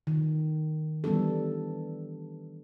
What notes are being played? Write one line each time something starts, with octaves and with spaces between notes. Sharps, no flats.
D#3
E3 G3 B3 D4 A4